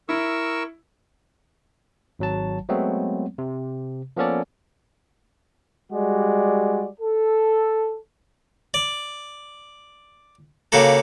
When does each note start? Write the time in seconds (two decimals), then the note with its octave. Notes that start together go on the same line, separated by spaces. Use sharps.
0.09 E4 A#4 C#6 E6
2.19 G#1 F#3 A5
2.69 F#3 G#3 A3 B3 C4
3.38 C3
4.17 F3 A#3 B3 C#4 A4 D5
5.92 G3 G#3 F#4 D5
7.00 A4
8.74 D5
10.72 C#3 A#3 F#4 G4 A4